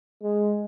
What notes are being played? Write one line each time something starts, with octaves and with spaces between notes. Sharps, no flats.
G#3